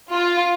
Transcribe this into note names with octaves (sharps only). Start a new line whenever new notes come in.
F4